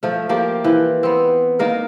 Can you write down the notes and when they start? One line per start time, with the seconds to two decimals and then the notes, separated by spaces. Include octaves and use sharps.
0.03 F3 A3
0.29 F3 A#3 G4
0.64 E3 F3
1.03 B3 C4
1.59 D#3 A#3 A#4